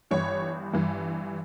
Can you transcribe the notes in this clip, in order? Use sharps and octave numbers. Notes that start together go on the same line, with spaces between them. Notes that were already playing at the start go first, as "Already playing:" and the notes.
G1 G2 E3 C#5
G1 G2 E3